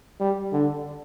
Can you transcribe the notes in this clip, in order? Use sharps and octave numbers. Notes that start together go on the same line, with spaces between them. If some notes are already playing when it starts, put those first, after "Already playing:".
G3
D3